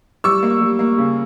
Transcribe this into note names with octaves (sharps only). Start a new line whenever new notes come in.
G3 C#6 E6
A#3
G3
A#3
C#3